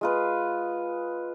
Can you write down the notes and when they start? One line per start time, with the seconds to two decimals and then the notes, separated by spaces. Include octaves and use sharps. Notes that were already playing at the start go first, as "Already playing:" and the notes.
0.01 G#3 F4 B4